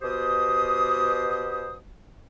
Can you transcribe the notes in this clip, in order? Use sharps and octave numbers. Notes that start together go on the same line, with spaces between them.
B2 G4 C5 D#6